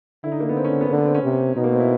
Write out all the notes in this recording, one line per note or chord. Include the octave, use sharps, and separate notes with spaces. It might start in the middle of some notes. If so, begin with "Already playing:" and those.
D3 E4
D#4
A#3
B3
C4
C#4
C4
B3
D3 A#3
B3
C4
C#4
C3
B2 D#4
A#3
C4
E4